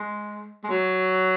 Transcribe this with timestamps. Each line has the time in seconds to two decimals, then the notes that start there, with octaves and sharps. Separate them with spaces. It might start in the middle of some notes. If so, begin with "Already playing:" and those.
Already playing: G#3
0.64 G#3
0.69 F#3